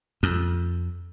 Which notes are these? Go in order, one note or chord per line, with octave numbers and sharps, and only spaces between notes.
F2